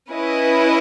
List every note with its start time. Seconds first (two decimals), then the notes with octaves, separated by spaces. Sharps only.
0.12 C#4 E4 B4 D#5